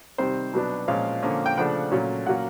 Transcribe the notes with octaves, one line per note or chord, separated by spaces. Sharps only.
C3 D#3 G3 C4 C5
B2 F#3 B3 D4
A#2 F3 G#3 C#4 F5
D3 F3 A#3 C#4
G5
C#3 F3 A3 D4 F#5
A#2 F#3 A3 C#4
A#2 F#3 A#3 C#4 F#5